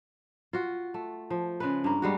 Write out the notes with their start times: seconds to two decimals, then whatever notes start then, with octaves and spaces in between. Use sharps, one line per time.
0.53 F4 F#4
0.94 A3
1.30 F3
1.60 C#3 G#3 B4
1.84 G2 A#3
2.02 G3 G#3 F#4